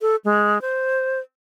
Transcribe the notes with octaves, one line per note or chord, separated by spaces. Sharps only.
A4
G#3
C5